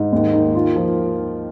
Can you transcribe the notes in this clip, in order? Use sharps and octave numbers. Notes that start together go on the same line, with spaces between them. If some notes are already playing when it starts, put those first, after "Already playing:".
Already playing: G#2
D#2
D#3
F4
F3